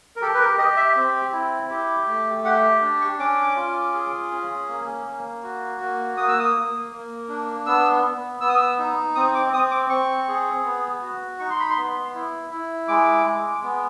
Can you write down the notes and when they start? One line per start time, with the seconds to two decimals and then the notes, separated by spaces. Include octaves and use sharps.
0.16 A#4
0.22 G4 A4
0.34 B4
0.40 A#4
0.58 G4 D#5
0.76 E5
0.96 C4
1.32 E4
1.70 G4
2.08 A3
2.44 G4 F#5
2.81 D4
3.01 C#6
3.19 C#4 D6
3.56 F4
3.93 G#4
4.32 C#4
4.68 A#3
5.06 A#3
5.43 F#4
5.81 A#3
6.17 A#3 D#6
6.28 E6
6.39 D#6
6.55 A#3
6.92 A#3
7.29 D4
7.66 B3 E6
8.04 B3
8.40 B3 E6
8.49 D#6
8.57 E6
8.78 D#4
9.15 C4 D#6
9.35 D6
9.53 C4 D#6
9.71 D6
9.90 C4 C#6
10.28 G#4
10.65 B3
11.02 F#4
11.39 D#4 C#6
11.50 C6
11.60 B5
11.69 C6
11.77 B3
12.14 E4
12.50 E4
12.88 G#3 D6
13.26 G#3
13.63 B3